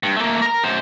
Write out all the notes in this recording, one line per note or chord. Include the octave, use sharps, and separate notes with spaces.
G2
A3 A#3
A#4 A#5
F#2 C5